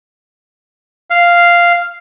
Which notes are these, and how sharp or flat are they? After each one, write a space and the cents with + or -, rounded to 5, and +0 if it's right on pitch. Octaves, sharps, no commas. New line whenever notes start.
F5 -5